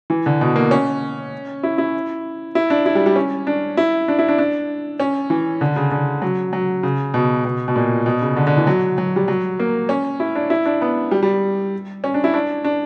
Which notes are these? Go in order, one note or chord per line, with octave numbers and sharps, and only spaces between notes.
E3
D3
B2
A#3
C#4
E4
E4
E4
D4
E4
G3
G3
C#4
D4
E4
D4
E4
D4
D4
C#4
E3
D3
C#3
D3
F#3
F#3
C#3
B2
B2
B2
A#2
B2
C#3
D3
D3
E3
F#3
F#3
G3
F#3
A#3
C#4
E4
D4
E4
D4
B3
G3
G3
C#4
D4
E4
D4
D4